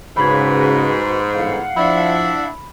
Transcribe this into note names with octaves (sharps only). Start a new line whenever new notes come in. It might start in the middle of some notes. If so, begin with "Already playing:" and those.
G#2 C#3 F#4 B4 B5 G#6
G1 A2 E3 F5 F#5
F3 D4 E4 B5